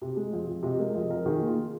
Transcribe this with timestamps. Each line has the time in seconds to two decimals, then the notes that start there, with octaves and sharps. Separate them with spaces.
0.02 C3
0.16 G#3
0.33 F2
0.47 F2
0.63 C3 D#5
0.79 G#3 A#4
0.94 F2 D#5
1.09 F2 A#4
1.26 D#3 G#4
1.41 A#3
1.46 F4